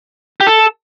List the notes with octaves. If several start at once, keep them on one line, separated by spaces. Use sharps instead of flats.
G4
A4